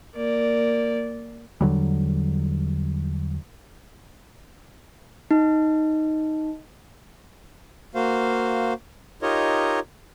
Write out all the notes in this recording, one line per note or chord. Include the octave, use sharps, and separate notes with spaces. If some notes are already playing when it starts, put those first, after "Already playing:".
A#3 D5
E2 D3 F#3 G3
D#4
A#3 F#4 C5 F5
D#4 F4 G4 A#4 C#5 D#5